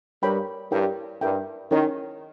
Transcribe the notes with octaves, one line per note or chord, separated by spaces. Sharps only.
G2 A#4 C#5 G5 B5
G2 E4 A#4 C#5 G5
G2 E4 A#4 E5 G5
D#3 C#4 E4 A#4 C#5 G5